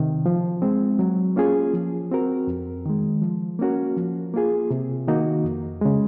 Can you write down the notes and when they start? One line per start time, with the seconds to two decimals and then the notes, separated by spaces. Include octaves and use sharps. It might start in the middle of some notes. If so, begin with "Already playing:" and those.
Already playing: C3 D#3
0.26 F3
0.62 G#3 C4
0.99 F#3
1.36 A#3 C#4 F4 G#4
1.73 F3
2.11 C4 F#4 A#4
2.47 F2
2.86 D#3 G#3
3.22 F3
3.59 A#3 C#4 F#4 A#4
3.97 F3
4.34 A#3 F4 G#4
4.70 C3
5.08 D#3 A#3 D#4 F#4
5.44 F2
5.81 C#3 G#3